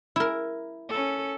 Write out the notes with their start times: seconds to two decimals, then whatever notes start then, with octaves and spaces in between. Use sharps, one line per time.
0.16 E4 A#4
0.88 C#4 A4